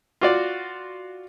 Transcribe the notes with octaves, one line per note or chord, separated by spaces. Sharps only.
F4 F#4 D5